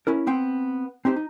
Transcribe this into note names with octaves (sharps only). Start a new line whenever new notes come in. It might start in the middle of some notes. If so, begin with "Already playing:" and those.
C#4 E4 A#4
B3 C4 G5
C4 D#4 G4 C5
D#4